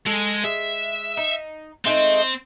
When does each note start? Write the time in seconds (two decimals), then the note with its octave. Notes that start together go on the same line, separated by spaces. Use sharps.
0.06 G#3 A4
0.44 G#3 E5
1.17 D#4
1.85 G#3 A3 C4 D#4